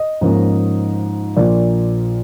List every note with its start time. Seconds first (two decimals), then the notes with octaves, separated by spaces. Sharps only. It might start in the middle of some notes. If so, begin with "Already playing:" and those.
Already playing: D#5
0.21 G#2 F3 A#3 C#4
1.37 A#1 A#2 F3 A#3 D5